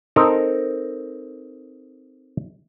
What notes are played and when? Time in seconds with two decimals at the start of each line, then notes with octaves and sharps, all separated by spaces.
0.16 C4 D#4 A4 A#4